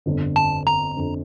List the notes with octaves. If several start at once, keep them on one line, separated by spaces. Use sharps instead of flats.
G1 F2 D3
A5
A#5
F2 D3